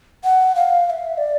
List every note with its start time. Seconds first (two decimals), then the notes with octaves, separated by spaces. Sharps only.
0.24 F#5
0.55 F5
0.87 F5
0.90 E5
1.18 D5